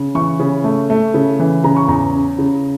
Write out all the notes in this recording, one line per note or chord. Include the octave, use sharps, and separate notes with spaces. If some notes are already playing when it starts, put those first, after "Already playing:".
Already playing: C#3
E3 C#6
C#3
A3
A3
C#3
E3
C#3 A#5
C#6
E2 A#5
C#4
C#3